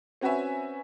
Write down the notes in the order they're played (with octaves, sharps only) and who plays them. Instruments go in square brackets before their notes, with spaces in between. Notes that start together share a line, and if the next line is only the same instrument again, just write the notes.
[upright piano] C4 C#4 F#4 B4 E5 G#5